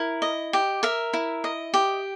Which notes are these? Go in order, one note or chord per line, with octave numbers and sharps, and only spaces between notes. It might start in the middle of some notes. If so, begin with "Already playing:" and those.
Already playing: E4 A#4
D#5
G4
A#4 E5
E4
D#5
G4